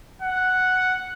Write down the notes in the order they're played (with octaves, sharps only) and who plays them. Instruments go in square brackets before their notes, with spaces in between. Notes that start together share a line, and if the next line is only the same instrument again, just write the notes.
[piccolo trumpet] F#5